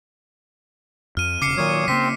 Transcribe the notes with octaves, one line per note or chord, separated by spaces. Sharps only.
F2 F6 D#7
E1 C#3 D6 C7 C#7
A#2 D#3 F#3 C#5 D#6
C#3 A#3 C4 B6